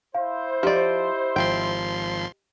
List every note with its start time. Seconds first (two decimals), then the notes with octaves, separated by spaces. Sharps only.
0.14 E4 C5 F5
0.63 F3 G4 D5 D#5
1.36 G#1 F3 G5 C6